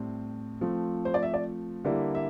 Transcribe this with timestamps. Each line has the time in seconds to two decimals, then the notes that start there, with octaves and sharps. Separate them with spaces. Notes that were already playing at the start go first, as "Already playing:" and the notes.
Already playing: A2 G3 C4
0.61 F3 A3 C4
1.05 C5
1.14 D5
1.23 E5
1.34 D5
1.85 D3 G3 A#3 E4
2.15 E5